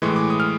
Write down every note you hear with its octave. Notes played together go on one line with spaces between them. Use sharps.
A2 E3 G#3 C6
D6
D#6
F6